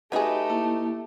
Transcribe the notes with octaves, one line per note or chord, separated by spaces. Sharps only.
F#3 A3 D#4 G4 G#4 B4
A#3 E4 A5